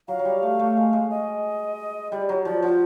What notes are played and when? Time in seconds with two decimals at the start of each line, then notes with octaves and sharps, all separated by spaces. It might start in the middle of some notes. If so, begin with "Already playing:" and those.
0.08 F#3 F5
0.19 F#3
0.25 G3
0.43 A3
0.59 A3
0.77 G#3
0.93 G#3
1.10 D#5
2.12 G3 D5
2.29 F#3 C#5
2.45 F3 D5
2.62 F3 F#5